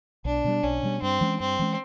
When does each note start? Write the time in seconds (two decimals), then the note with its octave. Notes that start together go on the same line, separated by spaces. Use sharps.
0.25 B1 D4
0.44 B2 G3
0.63 B1 C#4
0.83 B2 G3
1.02 G2 C4
1.21 E3 G#3 C#4
1.40 G2 C4
1.59 E3 G#3 C#4